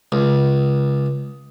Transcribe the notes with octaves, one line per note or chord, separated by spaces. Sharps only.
C#2